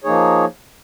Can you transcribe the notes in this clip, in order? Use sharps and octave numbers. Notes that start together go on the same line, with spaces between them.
F3 A#3 D#4 G#4 C#5